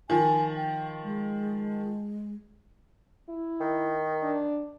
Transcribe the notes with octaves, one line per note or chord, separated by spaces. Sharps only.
D#3 F3 G#5
G5
G#3
E4
D#3
D4